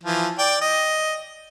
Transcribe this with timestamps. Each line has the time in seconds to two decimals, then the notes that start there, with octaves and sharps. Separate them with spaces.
0.03 E3 F3
0.39 D5 G5
0.61 D#5